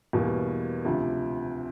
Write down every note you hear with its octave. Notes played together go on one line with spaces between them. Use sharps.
E2 B2 G3 A#3
D2 C3 F3